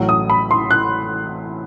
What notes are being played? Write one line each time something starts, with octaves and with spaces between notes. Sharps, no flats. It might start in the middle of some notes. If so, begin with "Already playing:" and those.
Already playing: A1 A2 F#3
D#6
B5
C6
F#6